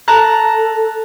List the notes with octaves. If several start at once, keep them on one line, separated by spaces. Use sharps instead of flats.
A4 A5 A#5 F#6